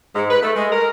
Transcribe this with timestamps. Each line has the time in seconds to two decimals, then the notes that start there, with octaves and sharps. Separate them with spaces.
0.15 G#2
0.31 B4
0.43 A3
0.55 G#3
0.72 A#4